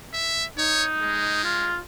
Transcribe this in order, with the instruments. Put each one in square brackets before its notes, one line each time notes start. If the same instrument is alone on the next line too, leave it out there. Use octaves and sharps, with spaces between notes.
[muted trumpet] E5
[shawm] D#4 [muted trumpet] C#5
[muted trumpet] G#3
[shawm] F4